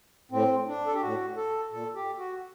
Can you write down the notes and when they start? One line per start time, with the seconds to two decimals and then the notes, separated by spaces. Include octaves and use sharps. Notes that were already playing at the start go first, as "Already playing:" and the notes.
0.31 A2 C4
0.67 D4
0.87 A4
0.94 G4
1.01 A2 F#4
1.36 A4
1.71 A#2 A4
1.95 G4
2.18 F#4